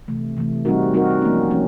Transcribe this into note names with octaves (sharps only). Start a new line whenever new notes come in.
C3 E3 A3
C3 E3 A3
G3 C4 D#4 F#4 A#4
G3 C4 D#4 F#4 A#4
F3 A#3 C#4
F3 A#3 C#4